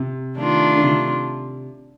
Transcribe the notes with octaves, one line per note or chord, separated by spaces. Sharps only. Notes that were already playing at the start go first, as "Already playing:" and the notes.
Already playing: C3
D#3 A3 D4 F4
D3
C3